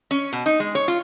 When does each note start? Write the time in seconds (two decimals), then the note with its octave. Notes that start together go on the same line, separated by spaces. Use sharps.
0.11 C#4
0.33 B2
0.46 D#4
0.60 G#3
0.75 C#5
0.88 F4